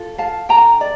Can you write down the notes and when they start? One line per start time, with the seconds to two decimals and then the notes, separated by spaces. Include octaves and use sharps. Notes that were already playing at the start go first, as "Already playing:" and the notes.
Already playing: F4 A4
0.18 F5 A5
0.49 D4 A4 G5 A#5
0.81 D5